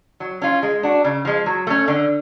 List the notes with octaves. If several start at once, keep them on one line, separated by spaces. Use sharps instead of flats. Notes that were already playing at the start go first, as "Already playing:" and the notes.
F#3
C#4 F4
G#3
D4 F#4
C#3
F3 G#3
F#3
A3 C#4
D3